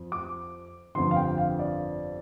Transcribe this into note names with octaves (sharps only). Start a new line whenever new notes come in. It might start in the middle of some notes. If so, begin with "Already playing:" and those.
Already playing: F2
D6
G1 F2 D3 C6
F5
G5
F5
D5